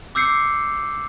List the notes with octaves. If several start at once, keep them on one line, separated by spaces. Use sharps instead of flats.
D6 E6 G6 C7 C#7